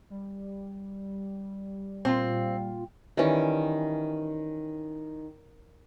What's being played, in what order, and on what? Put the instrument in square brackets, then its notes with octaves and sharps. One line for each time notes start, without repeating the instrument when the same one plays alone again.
[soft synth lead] G3
[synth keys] A#2 F4 [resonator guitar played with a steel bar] C4
[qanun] D#3 E3 G3 C#4